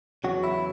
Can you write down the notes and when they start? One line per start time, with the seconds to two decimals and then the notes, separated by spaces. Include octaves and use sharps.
0.24 E2 C#3 F#3 F#4
0.44 E4